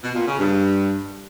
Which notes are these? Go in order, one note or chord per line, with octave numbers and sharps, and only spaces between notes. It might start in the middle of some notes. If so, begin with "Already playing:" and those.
B2
A#2
C#3
G2